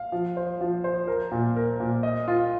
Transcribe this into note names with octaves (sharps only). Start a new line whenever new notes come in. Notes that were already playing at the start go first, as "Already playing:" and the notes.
Already playing: F5
F3
C5
F3
C5
A#4
A#2
A#4
A#2
D#5
F4